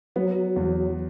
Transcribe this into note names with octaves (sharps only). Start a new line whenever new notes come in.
F#3 B3
E2